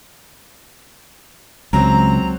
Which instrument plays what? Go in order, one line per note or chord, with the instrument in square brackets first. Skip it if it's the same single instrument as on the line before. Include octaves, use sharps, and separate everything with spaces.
[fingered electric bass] C#2 [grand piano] F#3 C4 [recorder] A#5